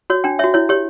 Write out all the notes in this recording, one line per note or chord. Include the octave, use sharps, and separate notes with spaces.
F#4 C#5
D4 G5
F#4 C#5 E5
E4 C#5
G4 C#5